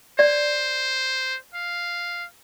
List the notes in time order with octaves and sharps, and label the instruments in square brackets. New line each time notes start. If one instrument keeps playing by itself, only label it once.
[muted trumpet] C5 [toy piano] D5
[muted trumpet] F5